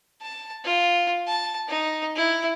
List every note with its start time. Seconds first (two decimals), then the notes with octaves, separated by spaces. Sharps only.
0.22 A5
0.64 F4
1.27 A5
1.68 D#4
2.16 E4